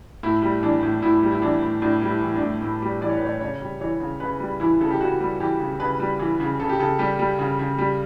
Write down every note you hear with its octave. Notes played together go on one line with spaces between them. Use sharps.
A2 E4
G3
E3 D4
A2
A2 E4
G3
E4
E3 D4
A2
A2 D4
G3
E4
E3
D4
A2
A2 E4
G3
E3 D5
C#5
B4
A2 C#5
C#3 C#5
G3
E3 C#5
C#3
C#3 B4
G3
E3 E4
C#3 A4
G4
C#3 F#4
G3
E3 G4
C#3
C#3 B4
G3
E3
C#3
C#3 A4
G4
C#3 A4
G3 G4
G3
C#3
C#3
G3